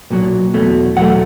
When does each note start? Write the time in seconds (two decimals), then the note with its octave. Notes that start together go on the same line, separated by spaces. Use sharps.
0.10 B1 A#2 F#3
0.54 E2 B2 F#3 A3
0.96 E2 B2 F#3 A3 F#5